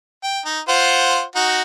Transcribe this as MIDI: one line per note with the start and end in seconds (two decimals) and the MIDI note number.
0.23 0.40 79
0.45 0.60 63
0.69 1.23 65
0.69 1.23 72
0.69 1.23 78
1.36 1.62 63
1.36 1.62 66